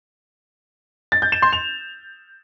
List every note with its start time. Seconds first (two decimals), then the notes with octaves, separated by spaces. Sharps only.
1.12 A6
1.22 G6
1.32 E7
1.42 C6
1.53 F7